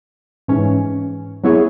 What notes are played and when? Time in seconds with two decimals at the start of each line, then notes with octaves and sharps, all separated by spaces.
0.48 G#2 E3 C#4
1.44 F#3 B3 E4 G#4 C#5